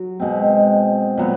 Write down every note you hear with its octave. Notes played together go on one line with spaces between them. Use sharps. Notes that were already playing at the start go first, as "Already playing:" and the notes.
Already playing: F#3 F#4
B2 G#3 C4
A#2 F#3 B3